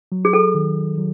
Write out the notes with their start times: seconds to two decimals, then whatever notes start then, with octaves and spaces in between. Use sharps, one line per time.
0.12 F#3
0.25 G#4
0.33 A4
0.55 D#3
0.98 F#3